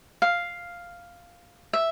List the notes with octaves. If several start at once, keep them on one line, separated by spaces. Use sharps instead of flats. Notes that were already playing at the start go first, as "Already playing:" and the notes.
F5
E5